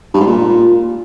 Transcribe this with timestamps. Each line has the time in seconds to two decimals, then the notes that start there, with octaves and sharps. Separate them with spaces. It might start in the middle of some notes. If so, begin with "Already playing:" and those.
0.14 G2
0.20 G#2
0.26 A#2